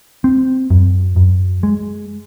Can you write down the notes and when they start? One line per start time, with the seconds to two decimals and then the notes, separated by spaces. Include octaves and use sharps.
0.24 C4
0.70 F#2
1.16 F#2
1.63 G#3